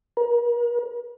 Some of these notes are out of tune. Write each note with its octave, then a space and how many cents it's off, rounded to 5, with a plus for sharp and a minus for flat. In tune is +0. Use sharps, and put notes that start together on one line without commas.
A#4 +40